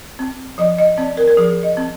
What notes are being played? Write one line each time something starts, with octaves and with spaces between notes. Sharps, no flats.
C4
F3 D#5
D#5
C4 D5
A#4
A#4
F3 G#4
D#5
C4